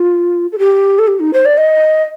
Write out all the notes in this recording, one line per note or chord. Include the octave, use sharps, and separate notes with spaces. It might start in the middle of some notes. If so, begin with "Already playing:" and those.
Already playing: F4
A4
G4
A4
G4
D#4
C5
D5
D#5